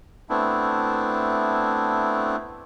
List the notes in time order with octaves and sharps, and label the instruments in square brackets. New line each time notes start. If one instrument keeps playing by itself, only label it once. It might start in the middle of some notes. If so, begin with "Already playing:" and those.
[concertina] A3 B3 C4 D4 E4